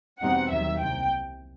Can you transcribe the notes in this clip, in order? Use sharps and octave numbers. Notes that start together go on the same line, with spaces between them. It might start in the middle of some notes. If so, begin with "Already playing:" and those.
E2 B2 G3 C4 D#4 F#5
D#2 D#3 F#3 E5
C2 C3 G5